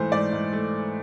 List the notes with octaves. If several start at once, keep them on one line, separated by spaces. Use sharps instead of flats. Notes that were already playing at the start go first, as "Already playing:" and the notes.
Already playing: G#2 E3 A3 C5
G#2 D5
G#2
A3